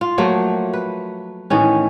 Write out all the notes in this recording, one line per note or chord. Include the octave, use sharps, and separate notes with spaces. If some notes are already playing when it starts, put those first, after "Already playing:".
F4
F3 F#3 A3 A#3
B4
A2 D#3 E3 C#4